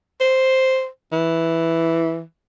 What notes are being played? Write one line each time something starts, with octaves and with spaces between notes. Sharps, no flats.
C5
E3